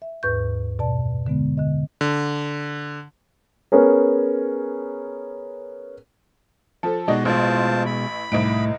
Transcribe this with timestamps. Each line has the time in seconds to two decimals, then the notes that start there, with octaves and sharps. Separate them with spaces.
0.02 E5
0.23 D#2 G#2 B4 C#6 G6
0.79 F#2 B2 D5 A5
1.26 D3 G#3 B3
1.57 D3 D#5
2.01 D3
3.72 B3 C#4 G#4 A#4
6.83 F3 A4
7.08 B2 G#3 D#4 F#4 D5
7.25 A1 F4 C5 A5
7.86 B5
8.32 C2 A2 D#4 D7